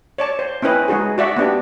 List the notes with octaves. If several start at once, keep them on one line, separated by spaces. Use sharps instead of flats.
C#5 D5 A5
C5
C4 C#4 E4 B4 D#5
G#3 D#4 F#4 G#4
F#4 D5 E5 F#5
B3 C4 D4 G4